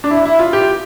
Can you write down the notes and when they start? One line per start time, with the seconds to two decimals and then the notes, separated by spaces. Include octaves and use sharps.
0.04 D4
0.11 E4
0.25 E4
0.39 F4
0.53 G4